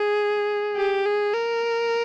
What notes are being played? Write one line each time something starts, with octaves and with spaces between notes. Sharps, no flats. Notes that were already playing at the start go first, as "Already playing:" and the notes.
Already playing: G#4
G4
G#4
A#4